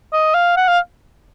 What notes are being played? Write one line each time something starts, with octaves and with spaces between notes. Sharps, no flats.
D#5
F5
F#5
F5